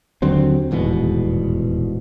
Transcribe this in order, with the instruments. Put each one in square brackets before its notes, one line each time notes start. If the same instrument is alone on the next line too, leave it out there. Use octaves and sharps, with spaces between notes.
[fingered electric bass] D#2 D3 F#3 C4
D#1 E2 G#2 B2